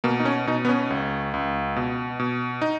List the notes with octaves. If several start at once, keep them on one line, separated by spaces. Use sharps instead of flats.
B2 A#3
D#4
C#4
B2 D#4
B3
C#4
C#2
C#2
B2
B2
D#4